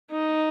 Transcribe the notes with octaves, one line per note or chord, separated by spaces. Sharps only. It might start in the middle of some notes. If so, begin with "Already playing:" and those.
D#4